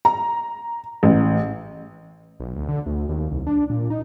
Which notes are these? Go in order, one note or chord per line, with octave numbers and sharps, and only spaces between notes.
A#5
A1
B1
D2
D3
D2
D#2
C2
D4
A#2
D#4